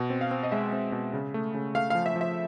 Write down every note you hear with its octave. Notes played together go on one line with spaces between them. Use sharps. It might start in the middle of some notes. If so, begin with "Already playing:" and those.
Already playing: B2
C4
F5
C4
D#5
G#3 E5
C4
B2
C#3
A3
C#3
A3 F5
F3 F5
E5
F3
E5